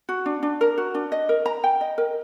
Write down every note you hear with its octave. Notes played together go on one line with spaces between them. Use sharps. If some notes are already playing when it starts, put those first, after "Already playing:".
F#4
D4
D4
A#4
F#4
D4
D#5
A#4
A#5
G5
D#5
A#4